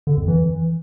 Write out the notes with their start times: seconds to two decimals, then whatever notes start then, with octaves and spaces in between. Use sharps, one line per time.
0.07 D3
0.17 F2
0.28 E3